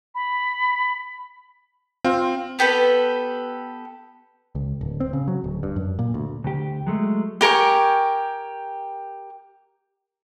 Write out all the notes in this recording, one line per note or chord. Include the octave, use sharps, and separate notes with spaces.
B5
C4 F4
B3 G4 A4 B4
C#2
D1
C4
C#3
F#3
D1
G2
F#2
A#2
D2
D2 G4
F#3 G#3 A3
G4 A#4 G#5 C#6